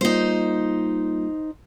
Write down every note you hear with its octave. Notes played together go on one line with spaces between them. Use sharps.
G3 A#3 D#4 F4 C5